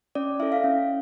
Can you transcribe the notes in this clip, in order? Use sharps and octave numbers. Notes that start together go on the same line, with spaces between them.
C#4 D5
E4 A4 E5
F5
C#4